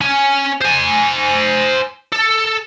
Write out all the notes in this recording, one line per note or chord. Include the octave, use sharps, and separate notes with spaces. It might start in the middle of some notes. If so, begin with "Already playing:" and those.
C#4 G#5
C5 G#5
A4